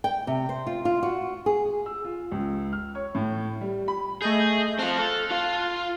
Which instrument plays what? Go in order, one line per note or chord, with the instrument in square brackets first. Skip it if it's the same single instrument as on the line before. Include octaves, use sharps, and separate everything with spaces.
[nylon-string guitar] G5
C3
C5
F4
F4
F#4
G#4
[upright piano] E6
F4
C#2
F6
C#5
A2
G3
B5
[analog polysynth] A3 D#5 G6 [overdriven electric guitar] G#4
[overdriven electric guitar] C4 F4 [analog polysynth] A5 F6 F#6
[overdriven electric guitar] A4
F4 F5